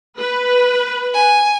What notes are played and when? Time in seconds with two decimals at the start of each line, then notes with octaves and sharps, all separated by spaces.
0.18 B4
1.14 G#5